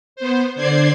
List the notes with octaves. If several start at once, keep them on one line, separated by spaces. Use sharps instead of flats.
B3 C5
D3 C5 D5 G#6 C7